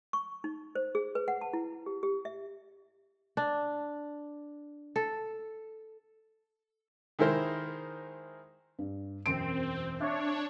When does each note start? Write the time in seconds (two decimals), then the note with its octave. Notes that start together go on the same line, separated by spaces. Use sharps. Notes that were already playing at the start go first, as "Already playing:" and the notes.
0.13 C#6
0.44 D#4
0.75 C5
0.95 G#4
1.15 B4
1.28 F#5
1.41 A5
1.53 E4
1.86 G4
2.03 G4
2.25 E5
3.37 D4
4.96 A4
7.19 D#3 G#3 E4 A#4 C5
8.79 G2
9.26 E1 F#2 C4 D7
10.00 D4 C#5 E5